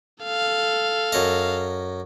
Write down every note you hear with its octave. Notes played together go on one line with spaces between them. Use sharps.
A4 F5
F#2 D#5